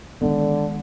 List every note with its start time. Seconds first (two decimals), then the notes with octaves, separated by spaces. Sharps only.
0.22 D3 D#3 G#3 B3